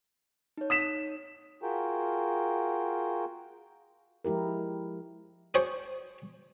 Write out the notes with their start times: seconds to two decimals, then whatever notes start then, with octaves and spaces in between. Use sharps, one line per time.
0.57 D#4 C#5
0.70 D#6 B6 E7
1.63 F4 F#4 G#4 A#4 G5
4.25 F3 G#3 E4 G4 A#4
5.54 D4 F#4 G#4 C5 C#5